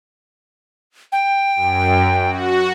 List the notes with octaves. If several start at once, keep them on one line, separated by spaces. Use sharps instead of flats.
G5
F#2
F#4